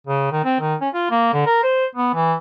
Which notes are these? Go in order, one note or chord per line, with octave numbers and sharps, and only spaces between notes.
C#3
D#3
C4
D#3
C#4
F4
A#3
D3
A#4
C5
B3
E3